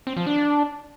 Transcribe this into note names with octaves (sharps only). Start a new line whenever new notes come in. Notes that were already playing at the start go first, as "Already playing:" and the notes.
C4
F3
D4